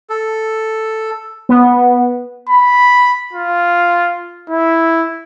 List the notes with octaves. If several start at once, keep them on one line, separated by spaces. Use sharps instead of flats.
A4
B3
B5
F4
E4